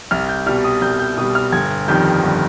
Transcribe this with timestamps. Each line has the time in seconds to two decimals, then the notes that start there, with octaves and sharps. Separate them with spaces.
0.11 C2 F6
0.29 G6
0.46 B2 G3 F6
0.64 D#6
0.82 C2 G6
1.00 G6
1.17 B2 G3 D#6
1.35 F6
1.52 G1 G#6
1.88 F2 D#3 G3 G6
2.23 G1